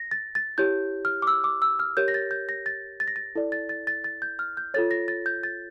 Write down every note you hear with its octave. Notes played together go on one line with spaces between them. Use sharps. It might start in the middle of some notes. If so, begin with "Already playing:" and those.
Already playing: A#6
A6
A6
E4 G4 C#5 G6
F6
D6
E6
D6
E6
F6
G4 A#4 C#5 G6
A#6
A6
G6
A#6
A6
A6
A#6
A6
E4 A4 D5
A6
A6
A6
A6
G6
F6
G6
F4 A4 C#5 A6
A#6
A6
G6
A6